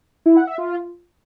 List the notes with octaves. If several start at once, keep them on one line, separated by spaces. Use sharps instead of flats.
E4
F#5
E5
F4